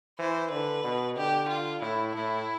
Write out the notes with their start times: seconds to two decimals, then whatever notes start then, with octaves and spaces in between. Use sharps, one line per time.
0.19 E3 C5
0.51 D3 B4
0.84 B2
1.17 D3 G4
1.49 F4
1.81 A2 E4
2.14 A2 E4